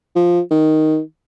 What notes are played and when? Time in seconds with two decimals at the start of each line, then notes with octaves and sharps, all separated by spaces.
0.16 F3
0.51 D#3